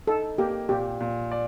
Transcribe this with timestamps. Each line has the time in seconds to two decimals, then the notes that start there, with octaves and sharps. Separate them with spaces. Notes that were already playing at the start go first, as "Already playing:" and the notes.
0.07 D#4 A4
0.38 A#3 G4
0.69 A#2 G4
1.01 A#2
1.32 D5